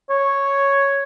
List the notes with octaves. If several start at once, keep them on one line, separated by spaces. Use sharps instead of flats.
C#5